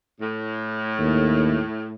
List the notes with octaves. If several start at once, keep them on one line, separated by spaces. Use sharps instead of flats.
A2
D#2